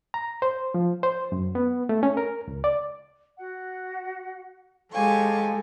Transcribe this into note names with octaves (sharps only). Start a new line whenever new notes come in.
A#5
C5
F3
C5
F#2
B3
A3
C#4
A#4
C#2
D5
F#4 F#5
G#3 G4 A4 C5 F5 G#5 C#6